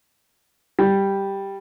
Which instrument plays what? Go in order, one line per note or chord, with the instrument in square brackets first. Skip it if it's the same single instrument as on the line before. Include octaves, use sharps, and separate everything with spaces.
[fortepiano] G3